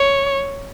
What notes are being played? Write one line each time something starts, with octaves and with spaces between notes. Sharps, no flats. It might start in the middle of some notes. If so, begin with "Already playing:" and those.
Already playing: C#5